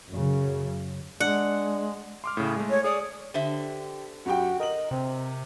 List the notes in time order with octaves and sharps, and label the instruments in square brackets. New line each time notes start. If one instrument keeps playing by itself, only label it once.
[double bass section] F#2 C#3
[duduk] G#3 [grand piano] D4 [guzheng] F#5
[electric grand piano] C6 D6 F6
A2 C#3
G#3 A3
[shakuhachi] C#5
[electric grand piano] G#4 C#5 D5 [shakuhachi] D#6
[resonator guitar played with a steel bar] D3 C5 E5 [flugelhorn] G4
[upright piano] F#2 G4 G5 [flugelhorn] F#4
[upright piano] A#4 F#7 [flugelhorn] D#5
[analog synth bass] C3 [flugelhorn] C4